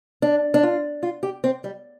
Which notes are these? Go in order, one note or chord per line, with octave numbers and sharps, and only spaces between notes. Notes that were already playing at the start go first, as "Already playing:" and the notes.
D4
D4
F4
F4
G4
C4
G3